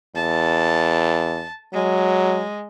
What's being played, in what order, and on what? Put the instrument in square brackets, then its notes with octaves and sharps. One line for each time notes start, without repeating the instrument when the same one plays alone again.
[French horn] E2 [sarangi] A5
[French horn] F#3 [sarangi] G#3